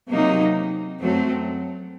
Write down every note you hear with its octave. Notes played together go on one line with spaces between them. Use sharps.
C3 F#3 A#3 D#4
F#2 F#3 A3 C4